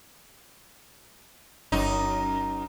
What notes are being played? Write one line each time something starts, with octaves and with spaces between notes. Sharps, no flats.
G1 F#2 D#4